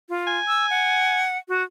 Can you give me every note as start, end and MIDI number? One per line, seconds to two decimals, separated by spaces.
0.09 0.37 65
0.27 1.24 80
0.48 0.66 88
0.70 1.38 78
1.48 1.63 66